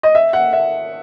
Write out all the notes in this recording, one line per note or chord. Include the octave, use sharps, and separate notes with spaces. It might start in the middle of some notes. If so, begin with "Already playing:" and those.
D#5
E5
F#5
E5